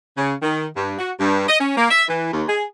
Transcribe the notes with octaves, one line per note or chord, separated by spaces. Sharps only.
C#3
D#3
G2
F#4
G2
D#5
C#4
A#3
E5
E3
D#2
G#4